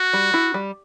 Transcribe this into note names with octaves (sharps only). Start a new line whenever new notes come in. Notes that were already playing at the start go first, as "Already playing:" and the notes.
Already playing: F#4
G3
E4
G3